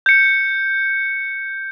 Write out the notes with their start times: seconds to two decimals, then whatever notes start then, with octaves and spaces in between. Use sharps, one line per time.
0.06 G6 C#7